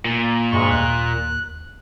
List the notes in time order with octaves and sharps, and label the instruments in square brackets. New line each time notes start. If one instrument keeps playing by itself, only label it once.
[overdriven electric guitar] A#2
[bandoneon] D2 G#3 C#6 [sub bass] G2
[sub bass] D#2 [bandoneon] F#6